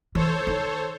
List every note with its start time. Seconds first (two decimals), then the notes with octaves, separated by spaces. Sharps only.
0.15 E3 A4 C5 C#5
0.47 D#3